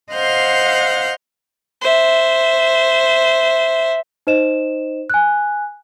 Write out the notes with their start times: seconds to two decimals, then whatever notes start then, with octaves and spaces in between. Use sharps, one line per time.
0.14 C5 D#5 F5 F#5 F6 G6
1.81 C5 E5
4.27 D#4 C5 D#5 E7
5.10 G#5 F#6